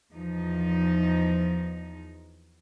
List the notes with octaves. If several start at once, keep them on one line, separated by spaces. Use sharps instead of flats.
E2 F3 D#4